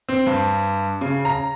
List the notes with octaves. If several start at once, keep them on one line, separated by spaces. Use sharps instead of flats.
C4
G2
C#3
A#5